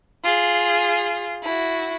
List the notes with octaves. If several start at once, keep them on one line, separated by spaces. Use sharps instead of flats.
F4 G#4
E4 F#4